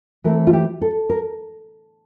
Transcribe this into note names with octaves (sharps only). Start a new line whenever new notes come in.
E3 A3 C4 A#4
F4
G4
A4
A#4